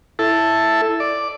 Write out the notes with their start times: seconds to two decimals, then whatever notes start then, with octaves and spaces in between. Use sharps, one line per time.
0.19 E4 A4
1.00 D5